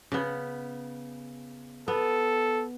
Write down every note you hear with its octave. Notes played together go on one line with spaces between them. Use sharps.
C#3 B3
B3 A4